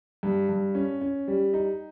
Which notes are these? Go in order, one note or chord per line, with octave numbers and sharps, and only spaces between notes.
G2
G2
C#4
C#4
G3
D#4